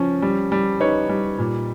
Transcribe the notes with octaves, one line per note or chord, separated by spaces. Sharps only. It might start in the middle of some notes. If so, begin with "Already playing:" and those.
Already playing: F3 C#4
G3
G3
D#4 B4 C#5
G3
A#2